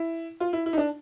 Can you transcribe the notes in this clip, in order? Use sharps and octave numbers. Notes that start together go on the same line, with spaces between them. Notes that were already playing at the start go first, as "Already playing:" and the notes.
Already playing: E4
F4
E4
E4
D#4
D4